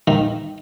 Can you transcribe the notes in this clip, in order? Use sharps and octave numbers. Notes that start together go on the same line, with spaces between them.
D#3